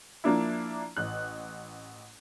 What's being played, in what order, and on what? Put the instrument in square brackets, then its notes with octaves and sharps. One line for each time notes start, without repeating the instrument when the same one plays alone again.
[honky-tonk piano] F3 A#3 D4 E4
A1 F#6